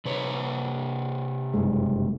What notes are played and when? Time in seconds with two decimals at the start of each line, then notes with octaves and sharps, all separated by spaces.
0.05 C3 B4 C#5
1.54 F#1 G2 G#3